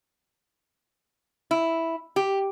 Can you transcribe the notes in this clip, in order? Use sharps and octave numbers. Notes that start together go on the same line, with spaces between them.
E4
G4